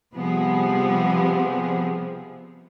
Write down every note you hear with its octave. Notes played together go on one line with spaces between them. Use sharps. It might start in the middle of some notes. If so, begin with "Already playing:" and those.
C3 F3 G3 B3 G#4